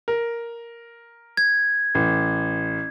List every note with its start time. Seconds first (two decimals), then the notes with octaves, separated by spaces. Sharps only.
0.08 A#4
1.37 G#6
1.95 A1